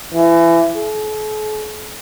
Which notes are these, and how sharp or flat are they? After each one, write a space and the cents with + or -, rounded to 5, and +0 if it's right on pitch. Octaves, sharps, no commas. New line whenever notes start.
E3 +30
A4 -45